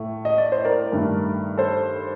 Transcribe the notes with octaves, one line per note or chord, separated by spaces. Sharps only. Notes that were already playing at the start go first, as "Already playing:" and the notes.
Already playing: A2 A3
D#5
D5
C5
A#4 D5
G2 D#3 A3
A4 C5